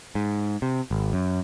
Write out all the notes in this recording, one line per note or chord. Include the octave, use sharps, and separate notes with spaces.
G#2
C3
G#1
F#2